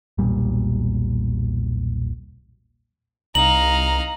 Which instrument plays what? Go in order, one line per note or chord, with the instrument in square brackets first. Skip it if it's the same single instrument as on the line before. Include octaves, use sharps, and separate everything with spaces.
[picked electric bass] E1 B1 A#2 G3
[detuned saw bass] C2 [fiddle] D#4 F5 [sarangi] A#5 [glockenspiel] F#7